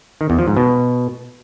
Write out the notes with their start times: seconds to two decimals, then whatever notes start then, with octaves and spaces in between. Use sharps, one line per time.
0.21 D#3
0.30 E2
0.39 F3
0.48 G#2
0.57 B2